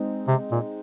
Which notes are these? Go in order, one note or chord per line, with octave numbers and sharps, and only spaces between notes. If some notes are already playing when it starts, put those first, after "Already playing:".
Already playing: G#3 C4 D#4
C3
A#2